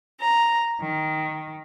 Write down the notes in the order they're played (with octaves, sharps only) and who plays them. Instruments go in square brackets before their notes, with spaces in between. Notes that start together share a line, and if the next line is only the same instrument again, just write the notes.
[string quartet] A#5
D#3